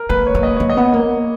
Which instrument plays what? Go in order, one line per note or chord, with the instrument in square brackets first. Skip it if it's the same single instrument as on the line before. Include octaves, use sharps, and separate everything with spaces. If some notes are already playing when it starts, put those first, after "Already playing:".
Already playing: [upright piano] A#4
[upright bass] A#3 [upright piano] B4
[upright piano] C#5
[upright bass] A#3
[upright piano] D#5
[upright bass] A#3 [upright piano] C#5
[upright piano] D#5
[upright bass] B3
A#3